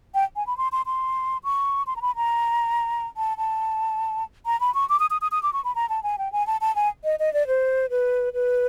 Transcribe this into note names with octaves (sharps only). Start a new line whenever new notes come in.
G5
G#5
B5
C6
C6
C6
C#6
C6
A#5
B5
A#5
A5
A5
A#5
B5
C#6
D6
D#6
D#6
D#6
D#6
D6
C#6
B5
A#5
A5
G#5
G5
G#5
A5
A5
G#5
D#5
D#5
D5
C5
B4
B4